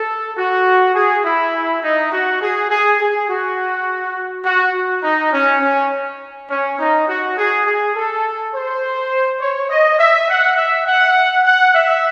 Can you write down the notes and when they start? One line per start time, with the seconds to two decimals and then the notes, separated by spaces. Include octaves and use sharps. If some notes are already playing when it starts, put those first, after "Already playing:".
Already playing: A4
0.37 F#4
0.95 G#4
1.25 E4
1.82 D#4
2.12 F#4
2.41 G#4
2.69 G#4
3.00 G#4
3.28 F#4
4.45 F#4
5.03 D#4
5.32 C#4
5.62 C#4
6.49 C#4
6.78 D#4
7.07 F#4
7.37 G#4
7.65 G#4
7.95 A4
8.53 C5
9.41 C#5
9.70 D#5
9.98 E5
10.29 F#5
10.57 E5
10.87 F#5
11.44 F#5
11.74 E5